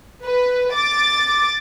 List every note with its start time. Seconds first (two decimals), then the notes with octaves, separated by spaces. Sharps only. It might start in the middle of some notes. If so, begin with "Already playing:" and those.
0.23 B4
0.73 D6 A6